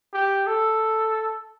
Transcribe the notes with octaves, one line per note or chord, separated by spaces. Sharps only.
G4
A4